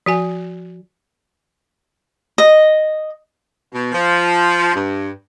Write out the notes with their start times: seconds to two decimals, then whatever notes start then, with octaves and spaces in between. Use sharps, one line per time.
0.06 F3 F#4 G#5
2.38 D#5
3.72 B2
3.92 F3
4.74 G2